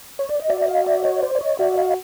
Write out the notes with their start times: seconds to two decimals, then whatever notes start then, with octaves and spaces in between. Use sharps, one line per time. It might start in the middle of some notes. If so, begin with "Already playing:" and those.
0.19 C#5
0.29 D5
0.40 D#5
0.50 F#4 D5 E5
0.61 E5
0.68 D#5 F5
0.86 D5 E5
1.04 C#5 D#5
1.22 C5 D5
1.35 D5
1.41 C#5 D#5
1.59 F#4 D5 E5
1.78 D#5 F5